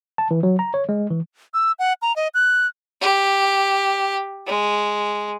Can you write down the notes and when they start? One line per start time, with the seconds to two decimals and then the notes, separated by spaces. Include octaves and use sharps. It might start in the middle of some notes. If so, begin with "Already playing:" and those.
0.18 A5
0.31 E3
0.43 F#3
0.59 A#5
0.74 C#5
0.89 G#3
1.11 E3
1.54 E6
1.79 F#5
2.02 A#5
2.16 D#5
2.34 F#6
3.01 G4
4.47 G#3